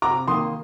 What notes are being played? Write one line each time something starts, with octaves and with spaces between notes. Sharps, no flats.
C3 A#5 D6
D#3 A#3 C6 D#6